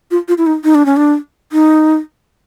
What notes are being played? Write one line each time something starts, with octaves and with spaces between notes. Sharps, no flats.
F4
F4
E4
D#4
D#4
D4
C#4
D4
D#4